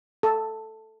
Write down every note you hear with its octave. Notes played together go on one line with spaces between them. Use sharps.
A4